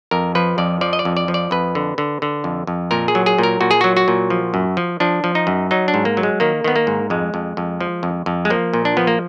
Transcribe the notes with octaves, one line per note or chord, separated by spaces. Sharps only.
F2 A#4
F3 B4
F2 D5
F3 D5
D#5
D5
F2
D5
F3
D5
F2 B4
D3
D3
D3
F2
F2
A#2 A#4
G#4
F#3
G#4
A#2
A#4
A#2 F#4
G#4
F#3 F#4
F#4
A#2
F3
F#2
F3
F3 D4
F3
D#4
F#2
F#3 D#4
D4
G#2
A#3
F#3
G#3
D#3 A#3
D#3 B3
A#3
G#2
F2 G#3
F2
F2
F3
F2
F2
G#3
F3 A#3
A#2
D4
F3 B3
A#3